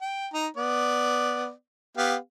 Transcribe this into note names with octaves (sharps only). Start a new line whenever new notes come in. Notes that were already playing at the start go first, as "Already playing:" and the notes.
G5
D#4 A#5
B3 D5
B3 G4 F5